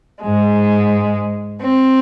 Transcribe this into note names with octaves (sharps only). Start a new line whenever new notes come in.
G#2 G#3
C4